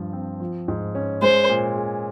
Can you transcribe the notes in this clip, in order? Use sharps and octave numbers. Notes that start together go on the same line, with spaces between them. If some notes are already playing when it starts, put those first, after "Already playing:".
Already playing: G2 F3
C4
F3
G#2
C#4
G#3 C5
A#2
G#4